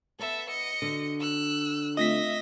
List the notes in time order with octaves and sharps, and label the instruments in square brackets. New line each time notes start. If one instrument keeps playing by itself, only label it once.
[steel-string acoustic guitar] B3 [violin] A4 E5
[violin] D#5 C#7
[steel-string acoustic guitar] D3 F#4
[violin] E6 F#6
[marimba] A3 C4 F4 [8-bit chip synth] D#5 A#6 B6 [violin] E5